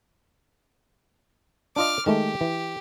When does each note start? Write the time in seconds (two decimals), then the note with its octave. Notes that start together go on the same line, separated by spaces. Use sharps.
1.76 D4 F4 D#5 D6 F6
2.06 D#3 G#3 A3 G4
2.41 E3